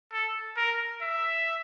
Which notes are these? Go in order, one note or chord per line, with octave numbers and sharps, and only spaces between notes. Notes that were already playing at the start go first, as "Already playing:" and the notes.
A4
A#4
E5